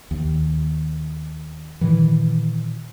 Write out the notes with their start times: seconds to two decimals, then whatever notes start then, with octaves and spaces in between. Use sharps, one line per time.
0.11 D#2
1.81 A#2 D#3 E3